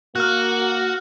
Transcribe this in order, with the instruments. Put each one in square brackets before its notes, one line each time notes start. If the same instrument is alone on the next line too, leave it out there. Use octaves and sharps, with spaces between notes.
[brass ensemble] A#3 [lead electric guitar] F#4 [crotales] F6 F#6